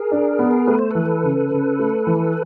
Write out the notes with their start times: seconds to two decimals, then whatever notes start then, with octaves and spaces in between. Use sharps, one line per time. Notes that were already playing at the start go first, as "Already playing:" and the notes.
Already playing: G#4 A#4
0.11 D4
0.39 B3
0.67 A3 B4
0.79 C5
0.91 E3 A4 B4
1.23 C#3
1.51 C#3
1.79 A3
2.07 E3